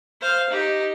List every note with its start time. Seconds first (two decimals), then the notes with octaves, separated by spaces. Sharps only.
0.21 C5 F5
0.50 D#4 G4